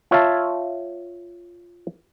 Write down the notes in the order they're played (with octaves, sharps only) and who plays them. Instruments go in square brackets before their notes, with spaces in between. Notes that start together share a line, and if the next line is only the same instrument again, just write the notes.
[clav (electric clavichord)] F4 C#5 E5 F5 A5